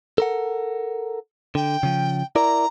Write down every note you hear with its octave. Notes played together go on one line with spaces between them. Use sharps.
A4 A#4 F#5
D3 G5
C#3 F3
E4 A#4 D5 A#5